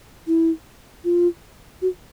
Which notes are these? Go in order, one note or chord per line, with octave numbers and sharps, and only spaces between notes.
E4
F4
F#4